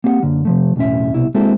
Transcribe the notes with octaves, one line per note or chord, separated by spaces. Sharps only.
A#3 C4 G4 F5 F#5
F#2 D3 A#3
C3 F3 A3
B1 E2 A2 C#4 E5
C2 B2 E4
G#3 A#3 C4 E4 F#4 A4